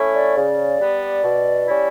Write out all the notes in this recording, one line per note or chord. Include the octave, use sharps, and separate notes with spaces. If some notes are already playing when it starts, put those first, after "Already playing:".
Already playing: A3 C#4 E4
D5
C#3
G3 B3
B2
G3 C#4 E4